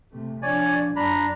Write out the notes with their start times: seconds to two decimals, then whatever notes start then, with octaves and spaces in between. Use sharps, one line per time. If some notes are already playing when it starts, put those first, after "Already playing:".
0.12 C3 A3
0.42 F3 D4 C#5 D5 G#5
0.96 F#2 F#3 D4 A#5 B5